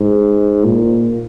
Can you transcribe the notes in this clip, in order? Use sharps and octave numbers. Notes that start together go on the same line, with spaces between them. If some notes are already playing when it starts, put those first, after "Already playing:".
Already playing: G#2
A#2